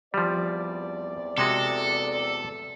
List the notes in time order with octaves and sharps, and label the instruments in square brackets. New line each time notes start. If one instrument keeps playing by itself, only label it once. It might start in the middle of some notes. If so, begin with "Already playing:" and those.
[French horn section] E2 C4 D5 [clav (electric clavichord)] F3 G3
[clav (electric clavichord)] C3 G#3 F#4 [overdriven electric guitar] A4